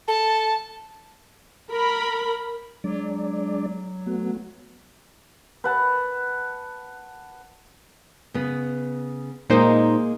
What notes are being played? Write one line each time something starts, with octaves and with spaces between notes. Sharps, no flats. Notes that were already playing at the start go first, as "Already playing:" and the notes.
A4 A5
A#4 B5
F#3 G#3 D4 D5
A3 B3 F#4
B4 F#5 A5
C#3 B3
A#2 G#3 A#3 D#4 C5